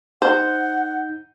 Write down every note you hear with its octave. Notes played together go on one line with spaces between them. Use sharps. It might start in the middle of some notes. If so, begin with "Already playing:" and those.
D#4 C5 F#5 G6